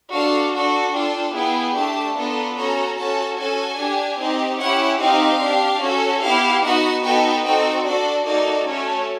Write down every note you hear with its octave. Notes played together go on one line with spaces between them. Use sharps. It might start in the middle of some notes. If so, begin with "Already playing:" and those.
D4 F#4 A4 F5
D4 F#4 A4
D4 F4 A4 G5
B3 E4 G#4 G5
A3 D4 G4 A5
B3 D4 F4 A4 A#5
C#4 F#4 A4 A#5
C#4 F#4 A4 A5
C#4 F#4 A4 G#5
D4 G4
C4 D#4 G4
C#4 E4 G4 F#5
C4 D#4 G4 F5
D4 G4
C#4 F#4 A4
B3 E4 G4 F5
B3 D#4 F#4 F#5
B3 D#4 F#4 A4 G5
C4 D#4 F#4 A4 G5
D4 F#4 A4 D5
A#3 D#4 F#4 A4 D5
A3 C#4 F#4 A4 C#5